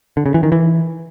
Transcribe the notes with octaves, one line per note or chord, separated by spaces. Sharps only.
D3
C#3
E3
D#3
E3